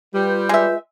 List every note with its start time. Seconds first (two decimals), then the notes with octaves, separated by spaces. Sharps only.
0.14 G3 F4 B4 G6
0.49 G#3 E5